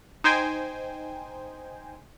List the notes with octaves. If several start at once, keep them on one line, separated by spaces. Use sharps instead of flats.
D#4 C5 G5 G#5